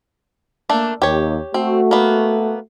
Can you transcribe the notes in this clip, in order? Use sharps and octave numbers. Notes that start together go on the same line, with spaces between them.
A3 A#3 D4
D#2 G4 C#5
A3 C4 F#4
A#3 B3